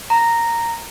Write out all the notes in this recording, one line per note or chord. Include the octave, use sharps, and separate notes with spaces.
A#5